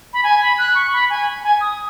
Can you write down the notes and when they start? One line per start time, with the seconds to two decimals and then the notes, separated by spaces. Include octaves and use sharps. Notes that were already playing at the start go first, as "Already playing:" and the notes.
0.13 B5
0.23 G#5
0.41 B5
0.58 F#6
0.75 C#6
0.93 B5
1.10 G#5
1.43 G#5
1.61 D#6